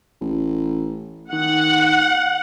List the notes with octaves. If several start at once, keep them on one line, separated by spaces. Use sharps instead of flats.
A1
D#3 F#5